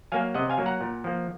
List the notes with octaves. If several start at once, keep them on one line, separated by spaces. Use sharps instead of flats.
F#3 A#3 F5 G#5
C3 D#5 F#5
F5 G#5
F#3 A#3
F#5 A#5
A#2
F3 A#3